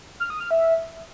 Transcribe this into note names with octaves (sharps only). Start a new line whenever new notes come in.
F6
D#6
F6
E5